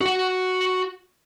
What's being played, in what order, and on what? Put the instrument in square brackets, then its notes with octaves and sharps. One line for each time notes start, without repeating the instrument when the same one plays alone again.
[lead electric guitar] F#4 F#5